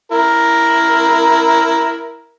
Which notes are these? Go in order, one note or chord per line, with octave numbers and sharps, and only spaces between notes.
E4 A#4